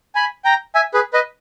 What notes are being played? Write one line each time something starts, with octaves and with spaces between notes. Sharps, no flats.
G#5 B5
G5 A#5
E5 G#5
G#4 B4
B4 D#5